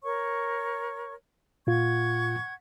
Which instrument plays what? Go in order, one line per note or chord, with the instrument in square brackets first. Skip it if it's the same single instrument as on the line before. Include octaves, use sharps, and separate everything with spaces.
[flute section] A#4 C#5 C#6
[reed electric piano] A#2 F4 [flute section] F#5 C#6 G#6